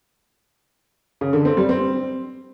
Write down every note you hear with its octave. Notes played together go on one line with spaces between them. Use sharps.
C#3
D3
C4
G3
C4